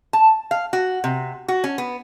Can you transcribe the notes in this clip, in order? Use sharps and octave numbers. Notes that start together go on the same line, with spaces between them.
A5
F5
F#4
C3
F#4
C#4
B3